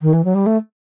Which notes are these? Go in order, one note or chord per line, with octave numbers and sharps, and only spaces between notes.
D#3
E3
F#3
G3
A3